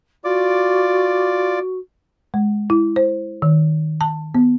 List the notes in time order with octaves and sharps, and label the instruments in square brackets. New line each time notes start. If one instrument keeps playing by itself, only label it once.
[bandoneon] F4 D5 D6 [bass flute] F#4
[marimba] G#3
E4
C5
D#3
A5
B3